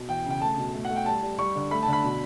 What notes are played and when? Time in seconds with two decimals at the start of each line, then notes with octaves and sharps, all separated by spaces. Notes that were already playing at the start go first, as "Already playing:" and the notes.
Already playing: B2
0.09 E3 G5
0.26 C#3 G5
0.41 A3 A5
0.57 B2
0.74 A3
0.85 F#5
0.90 A3
0.96 G5
1.06 G3 A5
1.22 G3
1.39 G3 C#6
1.55 D3
1.71 A3 B5
1.83 D3 A5
1.93 B5
2.03 B2